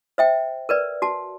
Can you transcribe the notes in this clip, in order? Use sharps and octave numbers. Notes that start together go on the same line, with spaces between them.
C5 E5 G5
A#4 B4 D5
F#4 A5